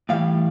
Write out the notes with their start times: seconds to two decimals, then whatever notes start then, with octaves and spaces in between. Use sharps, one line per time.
0.09 A2 E3 G3 F5